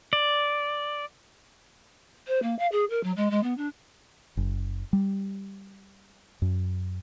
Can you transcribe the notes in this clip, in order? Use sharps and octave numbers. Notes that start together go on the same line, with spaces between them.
D5
C5
A#3
F5
G#4
A#4
F#3
G#3
G#3
B3
D4
F#1
G3
F#2